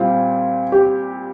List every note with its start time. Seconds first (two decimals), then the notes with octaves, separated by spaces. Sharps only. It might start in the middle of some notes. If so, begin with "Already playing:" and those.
Already playing: A#2 G3 C4 F4
0.72 G4